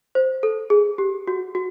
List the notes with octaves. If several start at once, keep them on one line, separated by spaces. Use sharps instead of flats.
C5
A4
G#4
G4
F#4
F#4